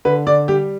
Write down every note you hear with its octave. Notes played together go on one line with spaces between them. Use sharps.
D3 B4
D3 D5
G3 G4